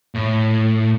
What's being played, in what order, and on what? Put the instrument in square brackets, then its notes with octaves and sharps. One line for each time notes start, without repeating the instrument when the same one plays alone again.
[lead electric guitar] A2